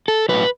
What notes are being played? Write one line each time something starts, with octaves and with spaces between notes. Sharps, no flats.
A4
A2 F#3 B4